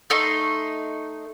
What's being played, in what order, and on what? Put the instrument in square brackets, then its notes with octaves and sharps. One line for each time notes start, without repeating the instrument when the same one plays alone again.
[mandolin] A3 D#4 C6